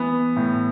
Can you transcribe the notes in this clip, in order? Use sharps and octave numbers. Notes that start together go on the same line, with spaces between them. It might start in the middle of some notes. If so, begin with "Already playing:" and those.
Already playing: E3 B3
A2